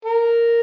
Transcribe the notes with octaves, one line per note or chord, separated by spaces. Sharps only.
A#4